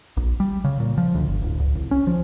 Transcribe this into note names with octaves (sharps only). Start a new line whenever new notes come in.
A#1
G3
C#3
A#2
F3
D2
G1
D1
C#2
C2
C#4
F3